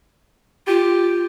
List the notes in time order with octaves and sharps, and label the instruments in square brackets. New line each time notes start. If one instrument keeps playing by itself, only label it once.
[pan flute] F4 [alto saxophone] G4